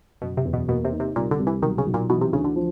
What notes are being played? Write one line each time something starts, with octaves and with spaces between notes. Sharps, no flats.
F#1 B2
C3
E2
B2
B2 A#3
C3
D#4
C3
C2 A#2
D3
C2
E3
B1 D#3
C#3
B1
A#2
B2 E3
C3
D2 C#3
D3
F3